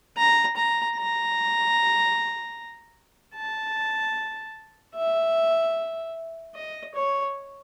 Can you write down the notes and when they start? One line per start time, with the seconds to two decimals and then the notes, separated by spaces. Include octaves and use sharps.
0.17 A#5
0.56 A#5
0.96 A#5
3.35 A5
4.96 E5
6.55 D#5
6.95 C#5